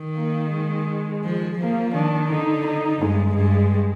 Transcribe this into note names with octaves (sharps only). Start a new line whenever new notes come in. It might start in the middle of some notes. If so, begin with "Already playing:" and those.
Already playing: D#3
A#3
G#3
F3
F3 A#3
D#3 D4
D3 D#4
D#4
G2 G#3
G2